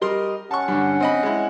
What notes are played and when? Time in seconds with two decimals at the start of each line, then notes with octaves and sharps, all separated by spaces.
0.02 G3 A#4 D#5 C6
0.51 C#4 F#5 A5 C#6
0.68 G2 D3
1.00 C4 D#5 B5
1.23 G#3 E4